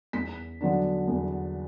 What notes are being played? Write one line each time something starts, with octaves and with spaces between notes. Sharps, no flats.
E2 B6
D3 F#3 B3 D4
E2